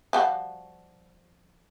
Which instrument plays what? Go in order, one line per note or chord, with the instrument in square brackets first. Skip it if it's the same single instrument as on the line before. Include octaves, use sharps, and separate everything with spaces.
[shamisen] F3 G3 F#4